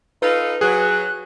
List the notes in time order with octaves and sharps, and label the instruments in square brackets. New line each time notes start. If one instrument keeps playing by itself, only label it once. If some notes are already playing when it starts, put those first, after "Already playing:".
[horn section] D#4 F4 A4 [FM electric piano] B4
[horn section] F#3 [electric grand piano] G#4 [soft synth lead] F#6